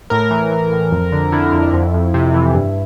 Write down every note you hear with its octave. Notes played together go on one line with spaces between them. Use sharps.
A2 A#4
E3
E3
A2
F2
D3
D3 E4
F2
F2
F2
C3
E3
G2